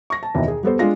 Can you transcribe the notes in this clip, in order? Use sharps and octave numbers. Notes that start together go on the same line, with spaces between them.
C#6 A#6
A5
D#2 B2 E3
G#4
G3 B3 A4 C5
G#3 D4 F4 A#6